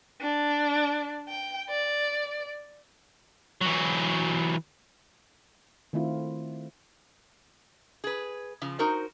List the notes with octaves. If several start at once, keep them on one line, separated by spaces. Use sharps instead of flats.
D4
G5
D5
E3 F#3
D#3 A3 C4 E4 F4
G#4 B4
C#3 F3
D#4 F#4 A#4 C5